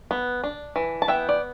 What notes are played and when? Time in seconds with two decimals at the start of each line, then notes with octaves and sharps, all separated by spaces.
0.11 B3
0.44 D4
0.76 E3
1.02 A5
1.08 B3 E5 G5
1.29 D5